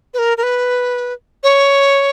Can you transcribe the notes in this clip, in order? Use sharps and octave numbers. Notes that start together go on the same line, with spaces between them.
B4
A#4
A#4
B4
C#5